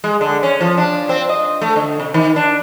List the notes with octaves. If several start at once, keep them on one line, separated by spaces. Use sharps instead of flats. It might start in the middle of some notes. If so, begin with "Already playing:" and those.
G#3
D3
C#4
F3
D4
C4
D#5
A3
D3
C3
D#3
D4